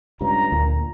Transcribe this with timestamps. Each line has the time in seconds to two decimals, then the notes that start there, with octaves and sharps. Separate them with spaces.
0.21 C#2 G2 C#3 A#5
0.52 D2 A#2